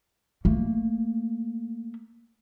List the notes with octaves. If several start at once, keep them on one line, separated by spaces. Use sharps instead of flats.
A3 A#3